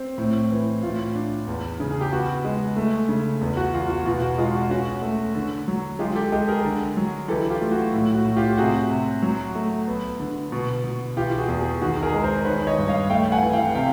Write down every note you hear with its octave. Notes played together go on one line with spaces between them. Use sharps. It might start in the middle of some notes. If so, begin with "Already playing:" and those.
Already playing: C4
A2
E3
A2 F4
D4
E2
C#3
G#4
G4
B3 F#4
G#3
A3
C#3
E2
F#4
E2 F4
F#4
B2 F4
F#4
G#3 F4
F#4
C#4 F#4
A3
D3
F#3
G#3 F4 G4
G4 A4
G#3 G4 A4
G#4 A#4
D3
F#3
E3 G4 A4
F4 G4
A3
F#4
A2
F#4
A2
F4 G4
C3 F#4 G#4
C3
F#3
A3
B3
D3
B2
B2
E3 F4 G4
F#4 G#4
E2
F#4 G#4
D#3 F#4 G#4
G#4 A#4
G#3
A#4 C5
D#3 B4 C#5
C#5 D#5
G2
D#5 F5
A3 F5 G5
F#5 G#5
E3
F5 G5
C3 F5 G5